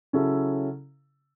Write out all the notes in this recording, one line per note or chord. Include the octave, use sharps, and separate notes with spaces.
C#3 F#3 C#4 E4 A4